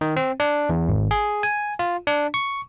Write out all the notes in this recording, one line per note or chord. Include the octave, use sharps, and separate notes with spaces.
D#3
C4
D4
E2
G#1
G#4
G#5
F4
D4
C#6